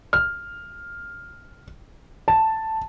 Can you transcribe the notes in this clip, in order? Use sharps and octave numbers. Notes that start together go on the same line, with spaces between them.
F6
A5